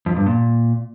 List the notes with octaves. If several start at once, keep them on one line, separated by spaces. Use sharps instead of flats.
F2
G2
A#2